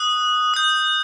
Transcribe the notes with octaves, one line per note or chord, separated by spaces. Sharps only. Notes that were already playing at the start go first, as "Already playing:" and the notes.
Already playing: D#6 F#6
D#6 G6